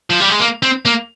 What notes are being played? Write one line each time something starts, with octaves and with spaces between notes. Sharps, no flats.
F3
G3
G#3
A#3
C4
A#3